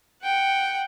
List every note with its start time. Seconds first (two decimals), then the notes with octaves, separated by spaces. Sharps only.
0.23 F#5 G5